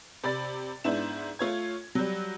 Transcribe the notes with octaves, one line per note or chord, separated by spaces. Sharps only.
C3 D5 B5 A6
G#2 B3 D4 E4 E7
A3 F4 C#5 G#6
F#3 G3